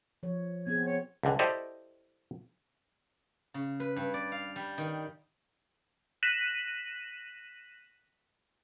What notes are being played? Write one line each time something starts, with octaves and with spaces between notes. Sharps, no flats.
F3 C#5
B3 C4 G#4 G#6
C#5
C#2 D3
E4 G4 A4 C5 D5 D#5
C#3
B4
G2
D5
F5
G3
D#3
F#6 A#6 B6 D#7 E7 F#7